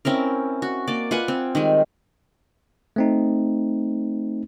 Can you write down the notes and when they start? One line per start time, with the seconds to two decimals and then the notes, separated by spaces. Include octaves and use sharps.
0.05 C4 C#4 E4 A#4
0.62 F#4
0.88 A#3 D5
1.11 F4 B4 F#5 G#5
1.28 C4
1.55 D#3 G3 G#3
2.96 A3 C4 D#4